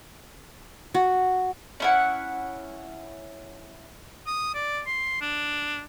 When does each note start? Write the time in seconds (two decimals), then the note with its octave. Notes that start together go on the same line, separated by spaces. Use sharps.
0.94 F#4
1.80 C#4 E4 F#5
4.26 D#6
4.54 D5
4.86 C6
5.21 D4